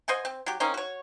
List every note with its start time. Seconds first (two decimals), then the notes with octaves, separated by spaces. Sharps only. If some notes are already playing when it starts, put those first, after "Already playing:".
0.08 C5 D#5 F#5 G#5
0.25 C4
0.46 F#3 G4
0.60 A#3 C4 C#4 D#4
0.74 F#4 C#5